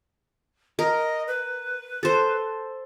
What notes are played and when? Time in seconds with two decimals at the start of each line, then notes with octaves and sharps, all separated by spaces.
0.79 A#4 D#5
1.28 B4
2.03 A4 C5